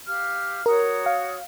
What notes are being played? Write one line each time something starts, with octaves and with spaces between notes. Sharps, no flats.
G4 F5 F6
F#4 A#4 C#5 D#6
F5